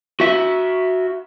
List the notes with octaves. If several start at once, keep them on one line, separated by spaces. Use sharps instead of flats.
F#4 E5